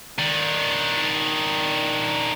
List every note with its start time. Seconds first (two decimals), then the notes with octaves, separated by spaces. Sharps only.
0.18 D#3 D4